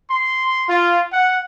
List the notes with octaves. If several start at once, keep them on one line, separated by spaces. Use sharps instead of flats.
C6
F4
F#5